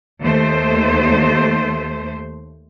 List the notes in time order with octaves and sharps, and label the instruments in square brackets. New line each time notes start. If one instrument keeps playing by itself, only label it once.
[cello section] D#2 A3 C5